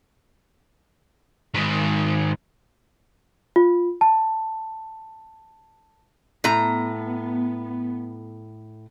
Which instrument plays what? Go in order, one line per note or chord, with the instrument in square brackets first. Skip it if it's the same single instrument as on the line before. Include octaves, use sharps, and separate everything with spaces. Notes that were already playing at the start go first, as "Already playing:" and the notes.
[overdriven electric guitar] G#2 D#3
[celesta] F4
A5
[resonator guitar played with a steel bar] A2 A#5 [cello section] B3